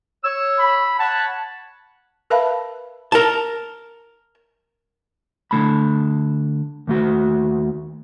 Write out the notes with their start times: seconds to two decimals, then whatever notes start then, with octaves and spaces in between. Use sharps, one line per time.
0.25 C#5 E6
0.59 B5
0.99 C#5 F#5 A5 B5
2.30 A#4 B4 E5 F5 A5 B5
3.12 A#4 A5
5.51 D3 A3 A5 B5
6.87 D#2 A3 F#4